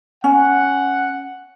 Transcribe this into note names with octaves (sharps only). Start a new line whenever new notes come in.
C#4 F#5